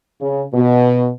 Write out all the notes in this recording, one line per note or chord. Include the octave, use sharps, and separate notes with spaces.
C#3
B2